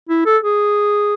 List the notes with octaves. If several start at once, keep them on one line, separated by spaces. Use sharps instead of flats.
E4
A4
G#4